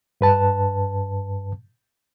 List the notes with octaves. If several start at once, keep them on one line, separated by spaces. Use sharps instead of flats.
G2 B4 A5